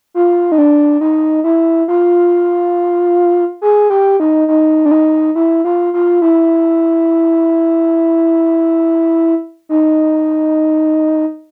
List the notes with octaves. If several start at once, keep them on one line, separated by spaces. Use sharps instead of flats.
F4
D#4
D4
D#4
E4
F4
G#4
G4
D#4
D#4
D4
D#4
E4
F4
F4
E4
D#4